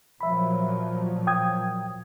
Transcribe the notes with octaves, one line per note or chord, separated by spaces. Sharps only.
A#2 F3 F#3 E5 B5
G5 D#6 G#6